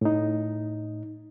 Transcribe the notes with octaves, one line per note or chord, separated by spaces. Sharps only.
A2 D#4